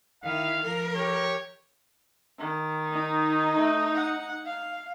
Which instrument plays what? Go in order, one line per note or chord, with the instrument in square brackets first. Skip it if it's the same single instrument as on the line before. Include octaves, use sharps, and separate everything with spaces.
[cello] D#3 E4 [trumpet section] F5
[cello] F3 A#4
[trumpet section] G4 C#5
[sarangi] D#3
[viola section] D#4
[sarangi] A3
F#5
F5